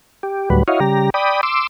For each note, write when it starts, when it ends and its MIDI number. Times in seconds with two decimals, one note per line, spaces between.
0.23 0.49 67
0.50 0.63 38
0.50 0.63 45
0.50 0.63 54
0.50 0.63 55
0.50 0.63 71
0.68 0.80 64
0.68 0.80 66
0.68 0.80 73
0.68 0.80 75
0.68 0.80 77
0.80 1.10 49
0.80 1.10 55
0.80 1.10 67
0.80 1.10 82
1.14 1.41 74
1.14 1.41 79
1.14 1.41 83
1.14 1.41 87
1.43 1.67 84
1.43 1.67 86
1.43 1.67 88